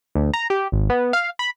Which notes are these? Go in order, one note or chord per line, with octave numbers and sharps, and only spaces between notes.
D2
A#5
G4
G#1
B3
F5
B5